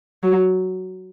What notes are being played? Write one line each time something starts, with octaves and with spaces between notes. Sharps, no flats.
F#3